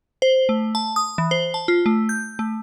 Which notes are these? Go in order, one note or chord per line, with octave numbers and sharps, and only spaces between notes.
C5
A3
A5
D#6
E3
C5
A5
F4
A3
G6
A3